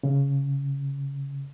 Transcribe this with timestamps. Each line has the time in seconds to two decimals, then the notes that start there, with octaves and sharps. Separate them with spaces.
0.03 C#3